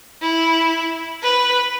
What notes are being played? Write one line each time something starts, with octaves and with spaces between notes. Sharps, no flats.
E4
B4